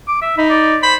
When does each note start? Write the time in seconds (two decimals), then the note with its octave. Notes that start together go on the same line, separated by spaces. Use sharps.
0.08 D6
0.22 E5
0.38 D#4 B5
0.50 D5
0.83 C5 B5